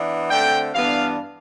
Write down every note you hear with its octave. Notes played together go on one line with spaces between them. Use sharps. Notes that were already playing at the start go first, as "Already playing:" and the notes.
Already playing: E3 B3 D4
D3 A3 C4 G5
G2 E3 B3 D4 F5